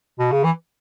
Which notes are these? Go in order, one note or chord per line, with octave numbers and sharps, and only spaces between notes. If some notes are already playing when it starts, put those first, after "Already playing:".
B2
C#3
E3